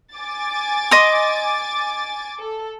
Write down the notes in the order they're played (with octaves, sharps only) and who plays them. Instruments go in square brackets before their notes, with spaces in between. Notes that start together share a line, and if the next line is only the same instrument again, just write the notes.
[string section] G#5 D6 A6
[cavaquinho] D#5 C6
[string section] A4